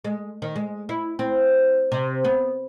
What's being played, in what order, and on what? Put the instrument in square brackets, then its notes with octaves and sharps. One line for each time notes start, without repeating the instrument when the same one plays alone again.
[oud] G#3
D#3
G#3
E4
C4
C3
B3